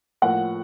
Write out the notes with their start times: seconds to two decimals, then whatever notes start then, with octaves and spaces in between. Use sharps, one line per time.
0.22 A2 F3 A#3 F#5